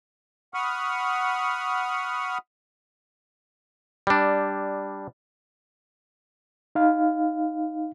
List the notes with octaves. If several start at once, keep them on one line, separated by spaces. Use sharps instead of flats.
F#5 B5 C#6 D#6 F6
G3 D4
D#4 F5